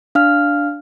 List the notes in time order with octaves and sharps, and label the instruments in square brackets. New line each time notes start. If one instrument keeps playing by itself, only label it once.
[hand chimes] D4 F5 F6